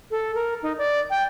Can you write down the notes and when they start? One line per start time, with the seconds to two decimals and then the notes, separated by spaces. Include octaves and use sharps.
0.11 A4
0.35 A#4
0.63 D#4
0.78 D5
1.10 G5